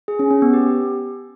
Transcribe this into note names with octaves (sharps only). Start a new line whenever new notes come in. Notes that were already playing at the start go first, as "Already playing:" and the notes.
G#4
C#4
C#4
B3
G4